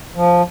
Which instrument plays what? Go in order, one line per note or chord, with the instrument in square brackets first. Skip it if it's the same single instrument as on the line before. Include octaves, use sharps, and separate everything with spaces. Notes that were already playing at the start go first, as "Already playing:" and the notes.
[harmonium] F3